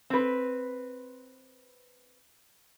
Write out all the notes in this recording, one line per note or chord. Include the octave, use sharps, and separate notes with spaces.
C4 B4